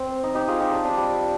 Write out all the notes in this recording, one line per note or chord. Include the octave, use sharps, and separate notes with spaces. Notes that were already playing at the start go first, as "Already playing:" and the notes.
Already playing: C4
D#4
D#4 G4
F4 G#4
D#4 G4
D4
D4
G3